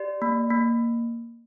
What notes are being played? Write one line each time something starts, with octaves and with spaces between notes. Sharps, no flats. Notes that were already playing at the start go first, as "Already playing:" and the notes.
Already playing: G4 D5
A#3
A#3